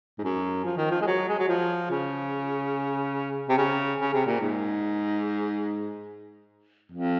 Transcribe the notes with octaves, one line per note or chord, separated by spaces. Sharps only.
G#2
F#2
F3
D#3
F3
G#3
F#3
G#3
F#3
F3
C#3
C3
C#3
C#3
C3
A#2
G#2
F2